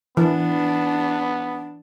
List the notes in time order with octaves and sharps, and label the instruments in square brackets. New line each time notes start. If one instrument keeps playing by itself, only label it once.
[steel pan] E3 [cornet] B3 [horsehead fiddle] D4